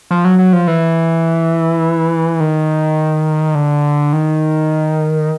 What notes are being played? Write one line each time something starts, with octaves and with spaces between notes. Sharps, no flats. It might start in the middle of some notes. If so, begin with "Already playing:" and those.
F3
F#3
F#3
F3
E3
D#3
D3
D#3